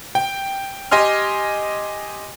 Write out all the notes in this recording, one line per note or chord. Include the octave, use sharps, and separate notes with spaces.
G5
G4 D#5 G#5 C6 F6